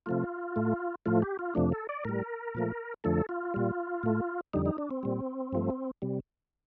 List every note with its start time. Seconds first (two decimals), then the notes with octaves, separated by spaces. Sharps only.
0.06 C3 F3 A3 F4
0.56 A2 A3
1.06 A2 F3 A3 F4
1.22 G4
1.39 F4
1.55 F2 C3 F3 A3 D4
1.72 A4
1.89 D5
2.05 A2 G3 A#4
2.55 A#2 F3 A3
3.04 F2 D3 F3 A3 A4
3.29 F4
3.54 A#2 G3
4.03 A2 A3
4.53 F2 D3 G3 D#4
4.66 D#4
4.78 D4
4.91 C4
5.03 A#2 G3
5.53 G2 F3 A3
6.02 C3 G3